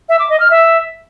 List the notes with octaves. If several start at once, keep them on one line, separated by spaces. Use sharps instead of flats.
E5
D6
D#5
F6
E5